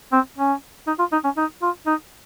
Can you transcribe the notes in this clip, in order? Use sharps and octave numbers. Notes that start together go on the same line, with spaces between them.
C4
C#4
D#4
F4
D#4
C#4
D#4
F4
D#4